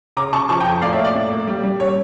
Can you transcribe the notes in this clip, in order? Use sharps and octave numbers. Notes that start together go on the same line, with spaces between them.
C#3 A#5 D6
C#3 A5 C#6
F3 A5 C#6
G5 A#5
F2
A2 D5 F5
C#5 E5
A#3
D5
A2
A#3
G3
G3
C#4 C#5